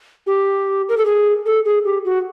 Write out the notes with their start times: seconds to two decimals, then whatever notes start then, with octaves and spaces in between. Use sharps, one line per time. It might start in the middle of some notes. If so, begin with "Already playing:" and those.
0.27 G4
0.89 A#4
0.97 A4
1.06 G#4
1.46 A4
1.65 G#4
1.85 G4
2.05 F#4